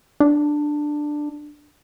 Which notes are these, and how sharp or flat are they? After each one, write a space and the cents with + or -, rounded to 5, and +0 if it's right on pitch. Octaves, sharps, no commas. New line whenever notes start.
D4 +10